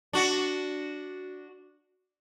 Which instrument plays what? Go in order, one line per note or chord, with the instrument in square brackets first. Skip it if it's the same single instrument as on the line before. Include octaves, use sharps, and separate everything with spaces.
[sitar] D4 F#4